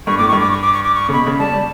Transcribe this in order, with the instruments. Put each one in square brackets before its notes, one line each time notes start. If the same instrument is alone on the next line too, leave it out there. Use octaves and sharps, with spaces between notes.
[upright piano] G2 [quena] C#6
[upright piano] A2 [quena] D6
[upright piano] G2 [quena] C#6
[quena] D6
C#6
D6
C#6
D6
C#6
[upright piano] C#3
[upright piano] B2 [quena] B5
[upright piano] C#3
[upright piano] G3 [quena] A5
[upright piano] G3